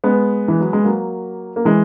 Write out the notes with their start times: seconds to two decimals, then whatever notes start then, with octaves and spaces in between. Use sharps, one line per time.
0.04 G#3 B3
0.48 E3
0.60 F#3
0.73 G#3
0.84 F#3 A#3
1.56 A#3
1.65 E3 G#3